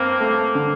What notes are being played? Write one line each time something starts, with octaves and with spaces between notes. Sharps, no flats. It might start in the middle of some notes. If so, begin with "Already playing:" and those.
Already playing: G2 A#3 C4
A3
D3